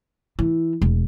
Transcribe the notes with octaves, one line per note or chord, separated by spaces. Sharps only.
E3
E1